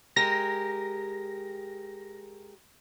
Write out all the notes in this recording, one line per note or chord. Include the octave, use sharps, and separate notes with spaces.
G#3 G4 A#4 A#6